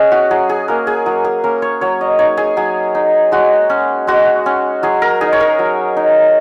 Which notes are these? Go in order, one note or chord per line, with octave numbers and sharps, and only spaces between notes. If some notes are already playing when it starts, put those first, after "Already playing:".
Already playing: C#4 G#4 D#5 F#5
F#4
F#3 G#4
G#4
A#3 C#4 A#4
G#4
F#3 G#4
G#4
A#3 C#4 A#4
C#5
F#3 C#5
D#5
D#4 C#5
G#4
F#3 G#4
D#4
G#3 F#4
C#4
G#3 F#4
C#4
F#3 G#4
A#4
D#4 G#4
C#5
A#4
F#3
D#4